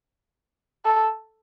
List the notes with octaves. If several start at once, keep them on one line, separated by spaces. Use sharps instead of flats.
A4